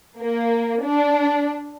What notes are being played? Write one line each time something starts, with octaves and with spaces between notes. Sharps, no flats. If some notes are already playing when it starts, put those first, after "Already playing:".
A#3
D4